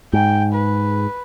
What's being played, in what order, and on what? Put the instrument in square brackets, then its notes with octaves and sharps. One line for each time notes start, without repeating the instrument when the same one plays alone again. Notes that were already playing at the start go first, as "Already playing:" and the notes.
[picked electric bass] G#2 [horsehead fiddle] G5
[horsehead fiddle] B4